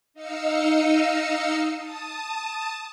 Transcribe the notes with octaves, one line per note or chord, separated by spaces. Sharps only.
D#4 D#5 F5 E6 C#7
A5 D#6